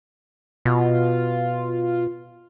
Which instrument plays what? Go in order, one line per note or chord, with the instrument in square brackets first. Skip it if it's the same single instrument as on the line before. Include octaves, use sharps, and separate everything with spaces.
[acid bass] B2 [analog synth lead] F4